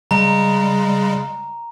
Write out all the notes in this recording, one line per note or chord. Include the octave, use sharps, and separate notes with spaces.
C#3 G3 G#3 A#5